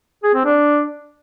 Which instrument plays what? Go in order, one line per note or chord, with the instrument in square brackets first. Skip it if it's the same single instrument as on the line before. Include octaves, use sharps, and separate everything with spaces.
[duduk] G#4
C4
D4